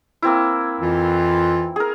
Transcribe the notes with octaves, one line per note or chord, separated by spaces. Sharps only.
A#3 C4 E4
F2 E3 F4
G#4 A#4